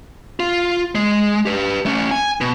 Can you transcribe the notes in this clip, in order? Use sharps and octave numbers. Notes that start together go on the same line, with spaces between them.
F4
G#3
G4 B4
A3 C#4
G#5
B2